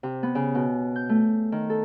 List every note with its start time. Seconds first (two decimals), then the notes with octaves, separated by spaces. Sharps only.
0.03 C3
0.23 B3
0.35 C#3
0.55 B2
0.96 G6
1.09 A3
1.52 D#3
1.70 A4